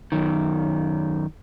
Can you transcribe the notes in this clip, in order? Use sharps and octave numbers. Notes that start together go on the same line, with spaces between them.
F#2 D#3